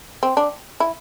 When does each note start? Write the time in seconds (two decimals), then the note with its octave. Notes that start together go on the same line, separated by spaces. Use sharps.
0.23 C4
0.37 D4
0.80 E4